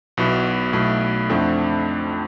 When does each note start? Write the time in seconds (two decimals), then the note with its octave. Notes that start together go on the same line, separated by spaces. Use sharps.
0.17 B1 B2 B3 E4
0.73 B1 B2 A3 E4
1.29 F2 D3 A3 C4 E4